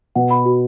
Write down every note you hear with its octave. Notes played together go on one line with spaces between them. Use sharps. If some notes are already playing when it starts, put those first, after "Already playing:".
B2 F#5
B5
F#4